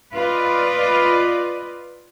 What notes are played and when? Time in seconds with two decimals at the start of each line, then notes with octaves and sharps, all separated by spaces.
0.14 F4 B4 D5 D#5